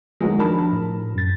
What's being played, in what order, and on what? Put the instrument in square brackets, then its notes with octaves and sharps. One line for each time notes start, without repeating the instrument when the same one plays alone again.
[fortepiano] D#3 F#3 G#3
[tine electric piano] F3 D4 [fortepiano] A#4 A5 B5
[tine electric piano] A2
F#2 A6